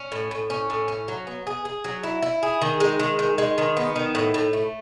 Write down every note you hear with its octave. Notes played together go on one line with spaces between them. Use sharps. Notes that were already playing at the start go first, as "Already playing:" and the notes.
Already playing: C#4
A2
A2
C#4
A2
C#4
F#3
B3
G#4
G#4
F#3
E4
E4
G#4
D#3
G#3
D#3
D#3
G#3
D#3
B3
D#3
A2
A2
A3